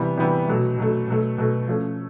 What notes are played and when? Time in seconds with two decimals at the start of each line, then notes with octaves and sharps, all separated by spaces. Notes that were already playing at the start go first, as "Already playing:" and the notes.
Already playing: C3 E3 G3 B3
0.17 C3 E3 G3 B3
0.48 B2 F#3 A3
0.78 B2 F#3 A3
1.08 B2 F#3 A3
1.38 B2 F#3 A3
1.67 F3 A3 C#4